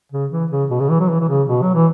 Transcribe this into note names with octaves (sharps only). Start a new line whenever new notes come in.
C#3
E3
C#3
B2
C#3
E3
F#3
E3
E3
C#3
B2
F#3
E3